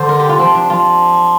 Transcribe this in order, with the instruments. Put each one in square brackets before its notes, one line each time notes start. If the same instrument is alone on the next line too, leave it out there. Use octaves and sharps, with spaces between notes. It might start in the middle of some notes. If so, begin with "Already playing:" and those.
Already playing: [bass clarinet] D3 [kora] C5
[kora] A#4
G4
F4
[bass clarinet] F3 [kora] C4
[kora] D4
[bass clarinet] F3 [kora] F4